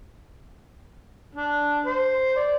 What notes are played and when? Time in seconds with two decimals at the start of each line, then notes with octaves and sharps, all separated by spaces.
1.35 D4
1.86 C5
2.37 D5